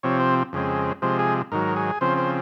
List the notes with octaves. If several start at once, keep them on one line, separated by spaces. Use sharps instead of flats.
C3 F3 C4 C#5
C5
F2 C#3 G#3 C4
C3 F3 G#3 C5
G#4
G#2 D#3 F#3 A#4
G#4
C#3 F3 C4 C5
C5